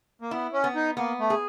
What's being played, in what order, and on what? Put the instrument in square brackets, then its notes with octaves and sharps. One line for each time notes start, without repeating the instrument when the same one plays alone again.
[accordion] A#3
[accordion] B3 [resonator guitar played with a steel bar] E4
[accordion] C#4
[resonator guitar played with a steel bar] B3
[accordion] D#4
[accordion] A#3 [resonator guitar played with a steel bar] B3
[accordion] A3
[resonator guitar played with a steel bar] G#4